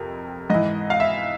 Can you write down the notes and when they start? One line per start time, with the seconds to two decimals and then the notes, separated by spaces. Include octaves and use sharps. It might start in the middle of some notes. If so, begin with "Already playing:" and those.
Already playing: F2 C3 A#4
0.50 G#2 E3 D#5
0.90 F5
1.00 E5